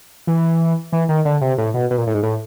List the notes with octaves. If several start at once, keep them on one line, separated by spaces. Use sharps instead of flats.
E3
E3
D#3
D3
C3
A2
B2
B2
A#2
A2
G#2
A2